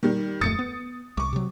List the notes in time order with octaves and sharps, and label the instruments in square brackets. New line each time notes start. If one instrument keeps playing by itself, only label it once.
[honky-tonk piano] D#3 G3
[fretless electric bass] D1 F2 A3 [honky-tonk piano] D#6 A6 C#7
[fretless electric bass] B3
[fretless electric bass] C2 [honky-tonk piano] C#6 D6
[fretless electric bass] C3 F#3